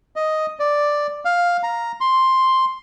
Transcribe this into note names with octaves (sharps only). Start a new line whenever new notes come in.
D#5
D5
F5
A#5
C6